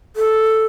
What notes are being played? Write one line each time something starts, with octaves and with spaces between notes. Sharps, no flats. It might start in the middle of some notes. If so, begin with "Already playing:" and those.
A4